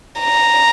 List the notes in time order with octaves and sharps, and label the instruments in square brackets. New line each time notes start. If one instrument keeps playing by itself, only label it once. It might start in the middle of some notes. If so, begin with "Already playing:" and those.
[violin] A#5